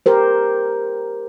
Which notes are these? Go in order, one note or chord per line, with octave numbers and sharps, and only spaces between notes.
G4 A#4 C5